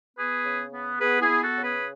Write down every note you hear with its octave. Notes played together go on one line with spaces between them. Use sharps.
B3 G#4 B4
C#3
B3
B3 G#4 B4
E4 G#4
B3
F#4 A4
C#3
G#4 B4